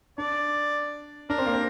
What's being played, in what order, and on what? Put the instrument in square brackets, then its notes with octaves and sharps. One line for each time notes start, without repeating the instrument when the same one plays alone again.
[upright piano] D4 [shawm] D5
[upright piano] D4 [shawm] A#4
[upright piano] C4
A#3
C4